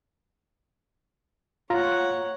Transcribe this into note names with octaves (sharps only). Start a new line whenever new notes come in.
F4 C#5 F#5 A#5